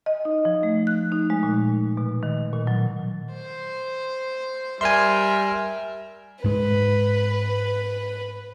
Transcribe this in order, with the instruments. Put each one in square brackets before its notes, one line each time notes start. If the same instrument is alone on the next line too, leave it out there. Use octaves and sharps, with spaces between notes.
[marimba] D#5
D#4
F3
A3
F#6
D#4
G#3
A#2
B2
D#3
A#2
F#3
[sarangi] C5
[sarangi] G3 [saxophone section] G4 A#4 E5 [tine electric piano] G#5 C6
[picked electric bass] G#2 G#3 [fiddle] B4